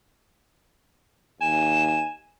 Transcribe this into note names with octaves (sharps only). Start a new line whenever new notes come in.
D#2 G#5 E7